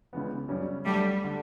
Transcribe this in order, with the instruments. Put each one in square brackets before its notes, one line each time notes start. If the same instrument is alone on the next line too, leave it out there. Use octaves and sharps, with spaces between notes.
[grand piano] C#2 C#3 E3 B3
F#2 C#3 G3 C#4
[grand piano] D2 D3 A3 [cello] G3
[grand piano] D3